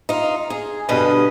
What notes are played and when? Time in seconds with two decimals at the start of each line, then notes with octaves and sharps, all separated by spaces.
0.09 D#4 F4
0.50 G#4
0.89 G2 B2 D3 B4 D#5